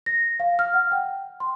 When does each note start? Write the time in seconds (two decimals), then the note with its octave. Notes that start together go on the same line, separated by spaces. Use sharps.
0.06 A#6
0.40 F5
0.59 F6
0.74 F#5
0.92 G5
1.40 C6